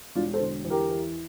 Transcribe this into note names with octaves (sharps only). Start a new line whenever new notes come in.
E1 D4 F4
A4 C5
D3
E2
G4 A#4
E3